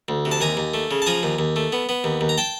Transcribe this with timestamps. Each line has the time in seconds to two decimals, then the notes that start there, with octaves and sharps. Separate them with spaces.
0.08 D2
0.25 C3
0.31 A5
0.41 D#2 G#5 A#5
0.57 D#2
0.74 A3
0.91 C#3
1.02 A5
1.06 F3 G#5 A#5
1.23 D#2
1.39 D#2
1.56 A3
1.72 B3
1.89 B3
2.04 D#2
2.21 D#2
2.29 A#5
2.38 G5 A5